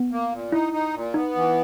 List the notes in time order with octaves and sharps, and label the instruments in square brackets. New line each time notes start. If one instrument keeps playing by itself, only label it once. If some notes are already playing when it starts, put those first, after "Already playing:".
Already playing: [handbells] B3
[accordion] A#3
A#2
[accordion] D#4 [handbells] E4
[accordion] D#4
A#2
[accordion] B3 [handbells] D#4
[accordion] E3